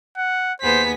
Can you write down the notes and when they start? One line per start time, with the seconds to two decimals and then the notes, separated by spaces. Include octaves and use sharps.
0.18 F#5
0.62 D#2 B3 G#4 C5 B6